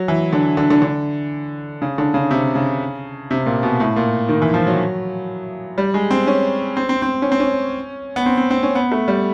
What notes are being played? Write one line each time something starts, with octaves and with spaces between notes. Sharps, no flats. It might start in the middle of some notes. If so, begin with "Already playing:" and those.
Already playing: F#3
E3
D3
D3
D3
D3
C#3
D3
C#3
C3
C#3
C3
A#2
B2
A2
A#2
D#3
E3
F3
F#3
G3
G#3
C4
C#4
C4
C4
C4
C#4
C4
C#4
B3
C4
C4
C4
C#4
B3
A3
G3